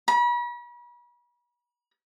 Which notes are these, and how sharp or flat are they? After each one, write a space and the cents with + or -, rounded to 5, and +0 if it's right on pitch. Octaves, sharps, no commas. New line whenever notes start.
B5 -40